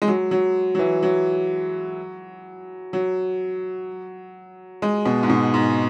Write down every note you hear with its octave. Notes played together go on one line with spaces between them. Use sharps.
G#3
F#3
F#3
F#3
E3
F#3
F#3
G#3
B2
G#2
B2
G#2